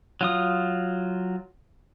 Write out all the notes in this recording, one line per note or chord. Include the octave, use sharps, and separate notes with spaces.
F#3 F4 D#6